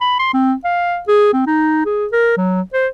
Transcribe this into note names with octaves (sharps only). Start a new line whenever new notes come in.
B5
C6
C4
F5
G#4
C4
D#4
G#4
A#4
F#3
C5